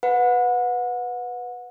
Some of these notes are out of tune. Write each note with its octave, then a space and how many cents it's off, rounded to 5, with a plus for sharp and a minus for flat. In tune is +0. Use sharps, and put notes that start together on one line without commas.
B4 +0 F#5 -30